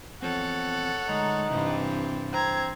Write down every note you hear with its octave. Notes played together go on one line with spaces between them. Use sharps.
E2 F3 C4 A4 C#5 F#5
D2 G#3 D#4 A#5
G2 C3 E3 C4
C4 A#5 G#6